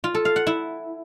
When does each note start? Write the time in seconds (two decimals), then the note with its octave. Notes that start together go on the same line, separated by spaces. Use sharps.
0.04 F4
0.14 A4
0.25 F5
0.36 F#5
0.47 E4